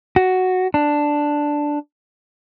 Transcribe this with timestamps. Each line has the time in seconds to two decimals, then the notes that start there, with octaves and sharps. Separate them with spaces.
0.16 F#4
0.74 D4